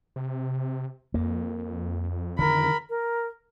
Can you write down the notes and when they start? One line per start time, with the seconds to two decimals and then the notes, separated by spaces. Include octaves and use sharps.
0.16 C3
1.14 F2 A#3
2.39 D3 D#3 A#4 B5
2.89 A#4